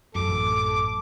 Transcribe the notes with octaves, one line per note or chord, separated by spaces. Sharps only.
A1 F#2 A4 D6